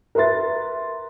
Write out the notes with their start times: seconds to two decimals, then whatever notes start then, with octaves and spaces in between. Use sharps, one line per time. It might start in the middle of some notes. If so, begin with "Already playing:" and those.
0.15 A#4 B4 E5 C6 A6